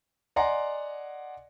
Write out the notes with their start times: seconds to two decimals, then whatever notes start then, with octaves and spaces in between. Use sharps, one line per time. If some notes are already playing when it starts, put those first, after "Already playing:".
0.36 D5 D#5 F#5 G#5 A#5 C6